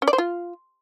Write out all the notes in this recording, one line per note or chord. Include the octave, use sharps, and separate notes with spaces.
C#4
D5
C5
F4